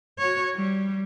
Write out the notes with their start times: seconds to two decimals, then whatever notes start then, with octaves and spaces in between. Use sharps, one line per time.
0.19 F#4 C#5
0.55 G3